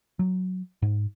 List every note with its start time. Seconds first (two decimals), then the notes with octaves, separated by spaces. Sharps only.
0.19 F#3
0.82 G#2